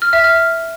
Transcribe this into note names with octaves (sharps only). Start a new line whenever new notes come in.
F6
E5
F6